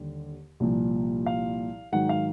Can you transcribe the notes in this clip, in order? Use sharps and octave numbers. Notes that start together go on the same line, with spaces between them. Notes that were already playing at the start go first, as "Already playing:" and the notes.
Already playing: D#2 D3 G3
C2 A#2 F3
F5
G#2 D#3 F#3 F#5
F5